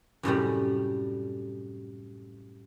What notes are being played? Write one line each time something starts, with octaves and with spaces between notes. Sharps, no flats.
F#2 A2 C3 G3